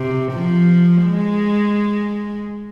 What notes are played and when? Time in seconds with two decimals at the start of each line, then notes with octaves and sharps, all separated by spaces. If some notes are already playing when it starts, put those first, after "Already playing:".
Already playing: C3
0.32 F3
1.05 G#3